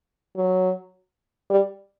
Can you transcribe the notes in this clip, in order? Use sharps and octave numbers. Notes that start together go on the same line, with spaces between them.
F#3
G3